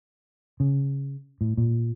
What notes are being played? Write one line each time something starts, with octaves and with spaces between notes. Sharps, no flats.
C#3
A2
A#2